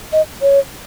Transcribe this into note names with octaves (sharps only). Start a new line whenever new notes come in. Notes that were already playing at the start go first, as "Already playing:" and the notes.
D#5
C#5